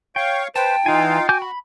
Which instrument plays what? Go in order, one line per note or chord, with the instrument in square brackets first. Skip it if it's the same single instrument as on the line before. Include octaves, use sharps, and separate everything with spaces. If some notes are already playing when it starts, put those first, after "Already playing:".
[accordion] C#5 F5 C#6 [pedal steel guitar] G5
[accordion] B4 C5 [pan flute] G5 [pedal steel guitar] A5
[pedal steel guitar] E3 G#5 [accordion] D#4 F4 F5
[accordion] F#4 [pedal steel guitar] G#5 D6 G6
[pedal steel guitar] B5